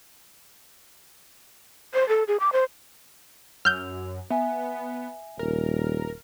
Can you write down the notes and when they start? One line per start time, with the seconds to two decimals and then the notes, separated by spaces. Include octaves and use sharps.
1.94 C5
2.08 A4
2.28 G#4
2.40 D6
2.53 C5
3.65 F#2 E6 F6 G6 F7
4.30 B3 E5 G#5
5.39 D#1 A#4